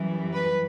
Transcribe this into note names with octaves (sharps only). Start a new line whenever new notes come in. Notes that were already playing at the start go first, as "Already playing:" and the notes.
Already playing: F#2 E3 G3
B4